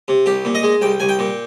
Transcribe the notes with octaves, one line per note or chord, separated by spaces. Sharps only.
C3
C2 G4
A#2
D#5
G#3
C2 G5
C2 G#5
G5
A#2